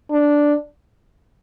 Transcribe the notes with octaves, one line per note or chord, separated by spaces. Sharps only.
D4